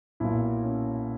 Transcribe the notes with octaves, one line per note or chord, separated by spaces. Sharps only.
B1 A#2 E4
C#4